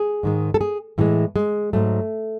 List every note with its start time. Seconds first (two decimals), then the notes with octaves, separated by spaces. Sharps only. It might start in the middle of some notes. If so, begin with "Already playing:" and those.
Already playing: G#4
0.23 G#2 D#3 G#3
0.54 A4
0.61 G#4
0.98 A2 E3 G#3 A3
1.36 G#3
1.73 G#2 F#3 A3